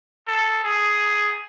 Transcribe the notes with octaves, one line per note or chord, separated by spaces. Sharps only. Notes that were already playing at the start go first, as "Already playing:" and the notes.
A4
G#4